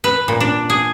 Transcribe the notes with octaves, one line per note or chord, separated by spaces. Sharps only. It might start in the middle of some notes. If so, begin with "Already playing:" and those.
B4
A#2
D4
G#4